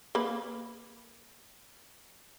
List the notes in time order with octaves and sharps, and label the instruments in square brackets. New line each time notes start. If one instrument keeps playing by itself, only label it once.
[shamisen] A#3 B4